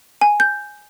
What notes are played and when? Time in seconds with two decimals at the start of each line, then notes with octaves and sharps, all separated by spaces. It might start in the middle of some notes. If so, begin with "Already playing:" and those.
0.21 G#5
0.40 G6